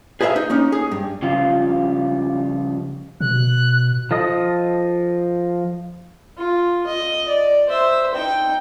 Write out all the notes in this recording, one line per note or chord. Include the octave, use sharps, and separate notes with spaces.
G#4 B4 C#5 E5 F5
D#4
A#3 C#4 D#4
G#4
G2
C#3 F3 G3 F4
B2 F#6
F3 A4 D#5 D#6
F4
D#5
D5
C5 E5
D#4 G5